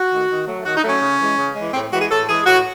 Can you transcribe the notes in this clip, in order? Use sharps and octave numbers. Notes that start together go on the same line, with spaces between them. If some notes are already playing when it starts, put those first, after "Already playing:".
Already playing: F#4
D#3 A3
D#3
F#3 A3
D#3 F#4
D#4
F#3 A3
C#4
C#3
E3 G#3
C#3
E3 G#3
A2 C4
E3 G#3 F#4
G#4
A2 A4
E3 G#3 G#4
A2 F#4